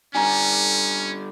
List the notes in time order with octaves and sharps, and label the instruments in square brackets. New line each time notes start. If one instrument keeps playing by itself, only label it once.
[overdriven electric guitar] D3 G3 [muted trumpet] C#4 [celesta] G#5 A#5